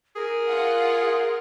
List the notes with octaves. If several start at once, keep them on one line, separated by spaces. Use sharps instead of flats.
G#4 A#4
F4 F#5